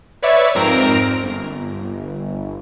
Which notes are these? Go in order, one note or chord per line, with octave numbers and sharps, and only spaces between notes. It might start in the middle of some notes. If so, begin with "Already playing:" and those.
B4 C#5 D5 E5 C#6
F2 G#2 C4 A#4 A#5 D7
G1